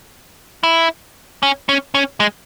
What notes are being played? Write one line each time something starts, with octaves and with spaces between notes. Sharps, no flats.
E4
C#4
C#4
C#4
G#3